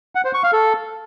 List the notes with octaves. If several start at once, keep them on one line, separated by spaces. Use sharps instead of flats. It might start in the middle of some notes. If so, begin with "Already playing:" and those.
F#5
C5
C#6
F5
A4